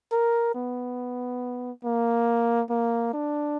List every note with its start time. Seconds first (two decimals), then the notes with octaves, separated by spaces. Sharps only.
0.12 A#4
0.55 B3
1.85 A#3
2.70 A#3
3.13 D4